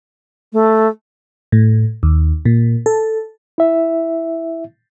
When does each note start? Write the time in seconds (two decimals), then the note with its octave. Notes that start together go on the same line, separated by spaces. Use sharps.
0.53 A3
1.52 A2
2.03 D#2
2.45 A#2
2.86 A4
3.58 E4 E5